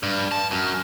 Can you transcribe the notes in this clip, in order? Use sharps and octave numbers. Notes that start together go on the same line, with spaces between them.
G2
A5
F#2